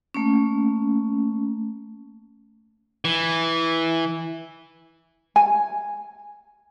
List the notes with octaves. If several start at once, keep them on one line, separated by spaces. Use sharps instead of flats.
A3 A#3 C#4
E3
G#5